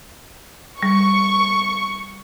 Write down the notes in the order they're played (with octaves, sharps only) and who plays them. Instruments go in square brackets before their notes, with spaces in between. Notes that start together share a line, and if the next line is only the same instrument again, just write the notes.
[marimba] G3 [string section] C#6